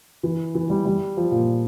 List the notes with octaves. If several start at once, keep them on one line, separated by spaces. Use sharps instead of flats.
E3
E3
G3
G3
F3
A#2